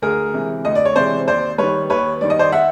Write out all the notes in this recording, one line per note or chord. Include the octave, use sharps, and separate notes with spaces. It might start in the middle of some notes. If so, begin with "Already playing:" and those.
D2 G#4 A#4
C3 E3 G#3
D2 D#5
D5
C#5
C3 E3 G#3 C5 D5
D#2 C5 D5
D#3 G3 B4 C#5
D#2 B4 C#5
D#3 G3 D5
D#5
C5 D5
E5 F#5